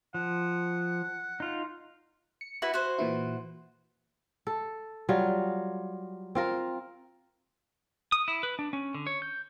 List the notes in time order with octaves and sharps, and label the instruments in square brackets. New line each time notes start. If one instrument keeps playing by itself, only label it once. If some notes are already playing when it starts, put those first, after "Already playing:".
[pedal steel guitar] F3 [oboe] F#5
[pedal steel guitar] D#4 F4
[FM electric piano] C#7
[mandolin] E4 F#4 B4
F#4 C5
[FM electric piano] A#2 E3 E4
[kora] A4
F#3 G3 F4
C4 F4 A#4
[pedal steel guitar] D#6
E4
B4
D4
C#4
D3
C#5
G6